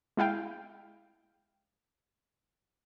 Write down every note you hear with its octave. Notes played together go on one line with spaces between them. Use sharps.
G#3 E4 F5 G5